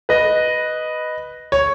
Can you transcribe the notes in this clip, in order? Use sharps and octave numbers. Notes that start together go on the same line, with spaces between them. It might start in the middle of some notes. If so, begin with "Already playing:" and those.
B4 D#5
C#5